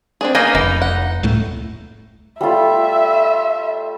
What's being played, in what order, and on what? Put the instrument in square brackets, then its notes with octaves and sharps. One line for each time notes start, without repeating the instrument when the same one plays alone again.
[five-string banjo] C4 D4 G#4
[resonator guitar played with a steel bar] A#3 D#4 B4 [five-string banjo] B3 G#4 G#5
[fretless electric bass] F1 [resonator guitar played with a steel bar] D#4 [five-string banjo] E4
[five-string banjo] F#5
[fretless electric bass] C#2 A2 A3
[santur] G3 A3 F4 [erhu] E5